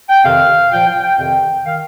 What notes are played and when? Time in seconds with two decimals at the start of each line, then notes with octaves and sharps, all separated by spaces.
0.09 G5
0.24 F2 C3 D#3 F5
0.71 A#2 F3 G5
0.87 G5
1.03 G5
1.18 F2 C3 D#3 G5
1.65 D#3 F5